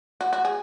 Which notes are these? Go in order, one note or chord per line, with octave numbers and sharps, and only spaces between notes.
F#4
F#4
G#4